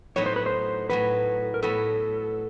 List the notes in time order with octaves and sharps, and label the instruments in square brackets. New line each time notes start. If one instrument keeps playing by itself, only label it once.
[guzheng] A2 F#3 B3 D#4 [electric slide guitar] C#5
[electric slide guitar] C5
B4
C5
[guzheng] A2 F#3 B3 [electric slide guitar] B4
[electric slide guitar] A#4
[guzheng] A2 F#3 B3 [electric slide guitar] A4